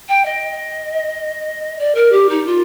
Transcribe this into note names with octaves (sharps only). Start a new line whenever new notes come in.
G5
D#5
D5
A#4
G4
D#4
F4